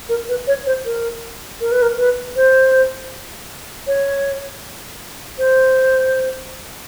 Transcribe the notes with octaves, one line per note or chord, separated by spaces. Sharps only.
A#4
B4
C#5
C5
A#4
A#4
B4
A#4
B4
C5
C#5
C5